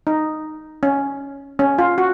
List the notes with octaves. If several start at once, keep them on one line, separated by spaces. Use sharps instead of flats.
D#4
C#4
C#4
F4
F#4